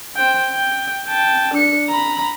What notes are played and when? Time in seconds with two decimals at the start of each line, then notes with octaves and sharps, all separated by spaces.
0.16 C5 G5
0.51 G5
1.07 G5 A5
1.54 D4 C#7
1.88 A#5 B5